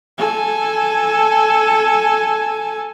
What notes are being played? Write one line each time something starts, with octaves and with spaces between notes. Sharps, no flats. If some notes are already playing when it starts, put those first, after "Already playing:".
A4 G#5